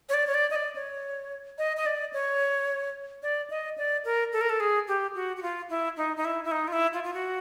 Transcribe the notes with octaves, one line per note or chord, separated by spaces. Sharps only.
C#5
D5
C#5
D5
D#5
D5
C#5
D#5
D#5
D5
C#5
D5
D#5
D5
A#4
A4
A#4
A4
G#4
G4
F#4
F#4
F4
E4
D#4
D#4
E4
E4
D#4
F4
E4
F4
F4
F#4